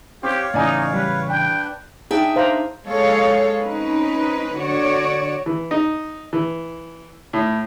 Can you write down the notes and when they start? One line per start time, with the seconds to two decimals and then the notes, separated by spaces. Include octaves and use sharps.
0.23 C4 G4 C#5 F5
0.54 A2 C#3 E3 D#4 D5 G#5
0.93 G3 B4
1.29 D4 B4 G5
2.11 D4 D#4 G#4 E5 G5
2.36 A#3 B4 C5 F5 A#5
2.85 G#3 G#4 A4 C#5 F5
3.58 C4 C#4 D#4 B4
4.57 D3 F#4 C#5 D5
5.46 E3
5.71 D#4
6.33 E3
7.33 A2